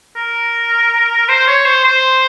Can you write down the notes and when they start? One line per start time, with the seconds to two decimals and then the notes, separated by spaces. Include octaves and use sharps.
0.17 A#4
1.29 C5
1.47 C#5
1.65 C5
1.85 C5